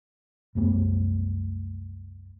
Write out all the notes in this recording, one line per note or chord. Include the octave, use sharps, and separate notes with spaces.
C2 F#2 A3 B3